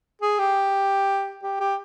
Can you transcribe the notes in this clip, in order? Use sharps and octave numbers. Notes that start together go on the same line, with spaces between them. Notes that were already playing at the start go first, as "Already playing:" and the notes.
G#4
G4
G4
G4